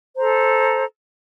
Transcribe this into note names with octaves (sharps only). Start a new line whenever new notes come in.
A4 C5 A#5